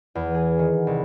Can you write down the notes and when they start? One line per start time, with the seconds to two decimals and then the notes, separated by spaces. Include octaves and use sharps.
0.15 E2
0.35 G#4
0.59 D#3
0.87 C2